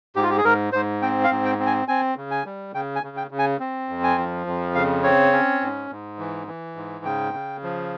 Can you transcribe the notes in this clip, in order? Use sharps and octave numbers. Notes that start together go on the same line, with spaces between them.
G#2 G4
F4
G4
G#4
G#2 A#4
G#2 C5
C4 G5
F5
G#2
G5
C4
G#5
C4 G#5
C#3
G#5
G3
C#3 G5
G#5
C#3
G5
C#3
G#5
C4
F2
G#5
F3
F2
C#3 F5
C4 C#5
C#4
G#2
G#2
E3
E3
G#2
C#3 G5
C#3
F3